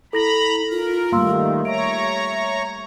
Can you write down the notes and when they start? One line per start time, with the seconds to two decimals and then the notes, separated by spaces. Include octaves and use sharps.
0.13 E4 A4 A#5 B5 A#6 F#7
0.71 F4 A#4
1.12 D#3 G3 A3 A#3 F5 C6 E6
1.65 C#5 E5 A#5 D7